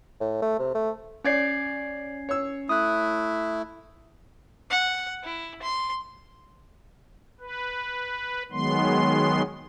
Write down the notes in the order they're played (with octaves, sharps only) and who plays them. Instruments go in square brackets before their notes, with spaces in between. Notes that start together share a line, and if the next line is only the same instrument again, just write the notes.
[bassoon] A2
A3
C3
A3
[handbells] C#4 G#6 C7 [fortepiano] C#5 D5
[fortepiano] C#5 E6
[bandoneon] A3 E4 [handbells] D#6 F#6
[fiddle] F#5
E4
C6
[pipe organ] B4
D#3 F#3 G#3 B3 C6